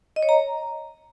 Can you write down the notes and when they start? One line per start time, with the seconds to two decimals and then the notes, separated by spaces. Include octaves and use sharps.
0.16 D#5
0.23 C#5
0.29 A#5